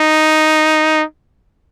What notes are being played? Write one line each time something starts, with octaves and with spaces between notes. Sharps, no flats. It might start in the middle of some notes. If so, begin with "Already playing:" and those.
Already playing: D#4